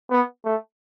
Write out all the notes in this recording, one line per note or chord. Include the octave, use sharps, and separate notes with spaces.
B3
A3